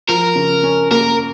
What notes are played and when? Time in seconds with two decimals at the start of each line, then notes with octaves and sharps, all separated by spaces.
0.08 F3 A#4
0.36 C#3
0.63 C#4
0.91 A#3 A#4